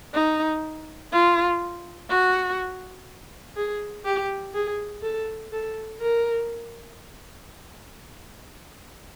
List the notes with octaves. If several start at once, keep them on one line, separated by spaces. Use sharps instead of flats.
D#4
F4
F#4
G#4
G4
G#4
A4
A4
A#4